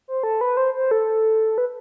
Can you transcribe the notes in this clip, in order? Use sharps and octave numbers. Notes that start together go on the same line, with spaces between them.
C5
A4
B4
C5
C5
A4
B4